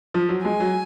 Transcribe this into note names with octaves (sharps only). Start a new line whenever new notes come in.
F3
F#3
G#3 G#5
F#3